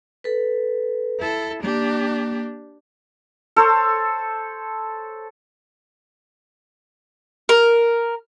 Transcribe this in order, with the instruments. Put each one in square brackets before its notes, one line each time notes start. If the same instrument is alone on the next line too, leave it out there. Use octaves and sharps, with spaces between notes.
[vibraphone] A4 B4
[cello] E4 A4
[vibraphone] A#3 [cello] D4 G4
[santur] A4 C5 C#5
[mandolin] A#4